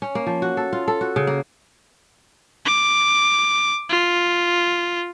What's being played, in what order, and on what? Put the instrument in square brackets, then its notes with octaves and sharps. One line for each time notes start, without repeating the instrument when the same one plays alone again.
[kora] C#4
A#3
F3
F#4
A4
F4
A4
F#4
C#3
A#3
[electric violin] D6
F4